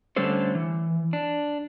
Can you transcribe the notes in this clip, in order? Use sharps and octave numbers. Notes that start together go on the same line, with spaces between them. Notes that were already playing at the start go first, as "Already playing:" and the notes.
D3 G3 A3 C#4 A4 C5
E3
D4